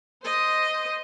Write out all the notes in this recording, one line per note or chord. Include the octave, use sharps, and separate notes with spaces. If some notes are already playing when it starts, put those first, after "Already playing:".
C5 D#5